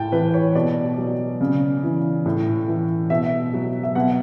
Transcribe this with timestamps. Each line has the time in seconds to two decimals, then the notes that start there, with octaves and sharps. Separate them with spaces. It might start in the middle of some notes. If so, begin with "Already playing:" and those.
Already playing: A2 G5 A5
0.12 E3 B4
0.34 C#5
0.55 B2 D5
0.98 F#3
1.41 C#3
1.83 E3
2.26 A2
2.68 E3
3.10 B2 E5
3.53 F#3
3.83 E5
3.95 B2 F#5